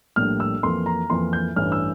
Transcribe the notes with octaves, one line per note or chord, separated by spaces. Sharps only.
A#1 A2 G3 A#3 D4 F6
E6
F2 E3 A#3 C6
A#5
F2 E3 A#3 C6
G6
A1 G2 E3 F6
E6